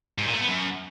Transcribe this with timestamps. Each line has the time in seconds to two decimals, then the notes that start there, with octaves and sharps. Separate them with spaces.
0.18 G#2
0.26 A#2
0.33 A3
0.41 B3
0.48 F#2